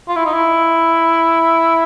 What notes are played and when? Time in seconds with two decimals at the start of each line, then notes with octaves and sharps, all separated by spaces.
0.08 F4
0.16 E4
0.25 D#4
0.33 E4